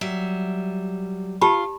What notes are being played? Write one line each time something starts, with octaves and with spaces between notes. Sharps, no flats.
F#3 G3 E5
F4 G4 A5 B5